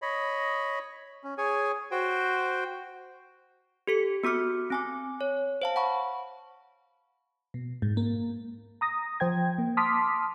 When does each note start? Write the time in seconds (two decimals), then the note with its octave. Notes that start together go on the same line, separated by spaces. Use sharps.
0.02 C#5 D#5 B5
1.24 C#4
1.38 G#4 C#5 G#5
1.91 F#4 C5 G5
3.87 G4 A4 C#7
4.24 B3 F#4 D6 F6 C#7
4.70 C4 G#5 D6
5.21 C#5
5.62 C5 F5 A5
5.76 F#5 A5 B5 C#6
7.54 B2
7.82 G#2
7.97 A#3
8.81 A#5 D#6 A#6
9.20 F3 C5 G5 G#6
9.58 A#3
9.77 A5 C6 D6 D#6 F6 B6